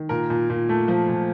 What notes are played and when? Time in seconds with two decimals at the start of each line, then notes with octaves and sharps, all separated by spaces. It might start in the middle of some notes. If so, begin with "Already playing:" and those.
Already playing: D#3
0.09 A#2 A#4
0.30 A#2
0.50 A#2
0.69 A3
0.88 F3
1.08 A#2